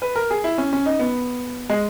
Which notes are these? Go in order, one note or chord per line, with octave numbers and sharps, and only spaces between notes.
B4
A#4
G#4
E4
C#4
C#4
D#4
B3
G#3